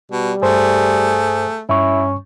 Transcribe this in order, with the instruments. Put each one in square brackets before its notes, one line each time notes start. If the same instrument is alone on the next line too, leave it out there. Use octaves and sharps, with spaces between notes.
[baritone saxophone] B2 [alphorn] G3
[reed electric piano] G2 C5 [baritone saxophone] A3 [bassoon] G#4
[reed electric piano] G2 C#6 [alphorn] C#4 [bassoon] E4